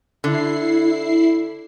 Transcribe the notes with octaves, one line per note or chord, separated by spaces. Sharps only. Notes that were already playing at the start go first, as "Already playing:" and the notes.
D3 E4 C7